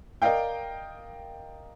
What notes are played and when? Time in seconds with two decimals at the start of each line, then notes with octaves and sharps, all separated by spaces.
0.22 A#4 D5 D#5 F5 G5